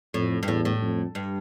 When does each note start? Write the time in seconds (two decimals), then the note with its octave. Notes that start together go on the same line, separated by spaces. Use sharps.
0.14 F2 A2
0.43 G2
0.48 E2 A2
0.65 A2
0.82 F2
1.15 G2